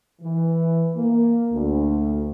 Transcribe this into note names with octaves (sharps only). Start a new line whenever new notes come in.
E3
A#3
D2